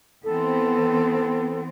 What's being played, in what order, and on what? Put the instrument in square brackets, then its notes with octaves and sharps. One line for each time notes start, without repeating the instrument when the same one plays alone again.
[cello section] E3 B3 C4 [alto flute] A4